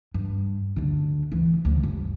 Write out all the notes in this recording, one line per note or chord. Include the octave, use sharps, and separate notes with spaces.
G2
D2 D3
D2 E3
D2 C#3
G1